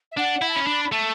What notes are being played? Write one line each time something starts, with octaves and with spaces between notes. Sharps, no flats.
E5
D4 F#5
E4
A5
C#4 B5
D4
B5
A3 A5